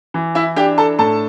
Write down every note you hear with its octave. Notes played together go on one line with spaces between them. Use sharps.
E3
E4 E5
D4 G4 G5
A4 A5
A2 A4 A5